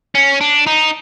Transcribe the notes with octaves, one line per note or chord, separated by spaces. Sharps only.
C#4
D4
D#4